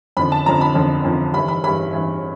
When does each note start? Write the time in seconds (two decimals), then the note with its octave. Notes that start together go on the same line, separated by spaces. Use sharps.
0.17 F2 D3 F3 B5
0.32 A5
0.46 F2 D3 F3 A#5
0.61 B5
0.75 F2 D3 F3
1.04 F2 D3 F3
1.34 G2 E3 B5
1.48 B5
1.64 G2 E3 B5
1.93 G2 E3